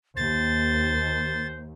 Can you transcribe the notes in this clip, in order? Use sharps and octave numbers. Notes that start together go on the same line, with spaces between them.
D#2 C5 A6